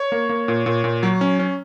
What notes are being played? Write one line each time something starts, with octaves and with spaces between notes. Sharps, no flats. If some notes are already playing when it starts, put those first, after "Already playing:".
Already playing: C#5
A#3
A#3
A#2
A#2
A#2
F#3
C#4
C#4